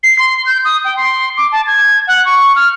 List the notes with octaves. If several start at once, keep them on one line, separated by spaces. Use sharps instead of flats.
C7
C6
G6
D#6
G5
C6
D6
A5
G#6
F#5
C#6
F6